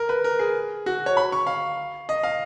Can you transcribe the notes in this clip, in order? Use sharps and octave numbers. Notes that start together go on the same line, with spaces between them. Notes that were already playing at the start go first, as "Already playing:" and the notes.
Already playing: A#4
B4
A#4
G#4
F#4
C#5
B5
C#6
F5
D#5
F5